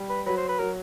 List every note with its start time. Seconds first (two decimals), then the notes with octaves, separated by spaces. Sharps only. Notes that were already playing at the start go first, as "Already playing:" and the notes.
Already playing: G3
0.10 B4
0.26 F#3 B4
0.37 C5
0.49 B4
0.59 F#3 A#4